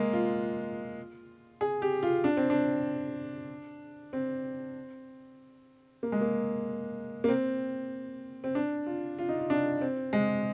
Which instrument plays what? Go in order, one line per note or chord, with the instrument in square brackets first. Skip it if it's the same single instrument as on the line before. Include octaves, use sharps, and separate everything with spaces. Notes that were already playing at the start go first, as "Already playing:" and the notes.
Already playing: [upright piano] G#3 A#3
F4
G#4
G4
F4
D4
C4
D4
C4
A#3
G#3
A#3
A#3
C4
C4
D4
F4
F4
D#4
F4
D4
C4
G#3